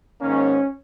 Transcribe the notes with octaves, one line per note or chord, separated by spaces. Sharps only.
G#2 D#3 A#3 C#4